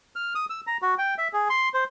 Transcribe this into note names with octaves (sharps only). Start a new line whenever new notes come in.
F6
D#6
E6
A#5
F#4
G5
E5
G#4
C6
C5